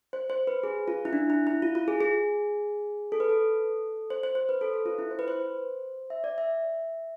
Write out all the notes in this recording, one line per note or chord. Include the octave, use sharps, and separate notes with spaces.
C5
C5
B4
G#4
F4
E4
D4
E4
E4
F4
F4
G#4
G#4
A4
B4
A4
C5
C5
C5
B4
A4
A4
F4
E4
C5
B4
C5
E5
D5
E5